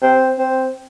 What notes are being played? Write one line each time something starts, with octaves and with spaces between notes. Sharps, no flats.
C4
C4